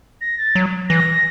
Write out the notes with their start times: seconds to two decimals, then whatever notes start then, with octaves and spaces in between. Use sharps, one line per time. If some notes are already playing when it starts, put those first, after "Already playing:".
0.21 A#6
0.38 A6
0.55 F#3
0.89 E3 A#6